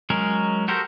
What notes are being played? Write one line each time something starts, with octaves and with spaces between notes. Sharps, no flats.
F#3 G#3 C#4 A#4
F#4 G4 A4 A#4 C5